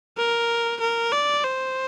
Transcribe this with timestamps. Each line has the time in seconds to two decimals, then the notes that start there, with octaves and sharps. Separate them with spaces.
0.18 A#4
0.81 A#4
1.12 D5
1.44 C5